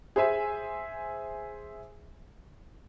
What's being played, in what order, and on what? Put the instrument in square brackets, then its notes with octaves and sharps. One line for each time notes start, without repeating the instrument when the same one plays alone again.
[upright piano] G#4 C5 E5 G#5